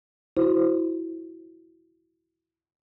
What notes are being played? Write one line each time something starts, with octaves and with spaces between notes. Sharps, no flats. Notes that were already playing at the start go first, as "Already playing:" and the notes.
E4 F#4 C5